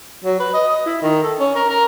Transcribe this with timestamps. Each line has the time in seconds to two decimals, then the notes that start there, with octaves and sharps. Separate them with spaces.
0.24 F#3
0.40 B4
0.54 D#5
0.69 D#5
0.86 E4
1.02 D#3
1.23 A4
1.39 C#4
1.56 A#4
1.70 A#4